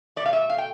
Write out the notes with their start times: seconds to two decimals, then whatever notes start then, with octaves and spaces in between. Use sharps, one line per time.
0.16 A3 D5
0.20 B2
0.26 F5
0.33 E5
0.50 F5
0.58 G5